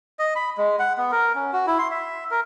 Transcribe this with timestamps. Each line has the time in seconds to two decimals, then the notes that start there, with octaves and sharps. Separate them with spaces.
0.19 D#5
0.35 B5
0.57 G#3
0.79 F#5
0.98 B3
1.11 A#4
1.35 C#4
1.53 F#4
1.67 E4
1.79 C6
1.91 E5
2.31 A#4